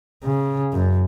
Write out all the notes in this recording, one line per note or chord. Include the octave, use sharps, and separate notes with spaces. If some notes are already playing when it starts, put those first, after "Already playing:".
C#3
F#2